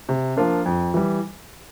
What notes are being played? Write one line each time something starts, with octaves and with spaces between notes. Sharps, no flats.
C3
F3 A#3 D4 F4
F2
E3 G3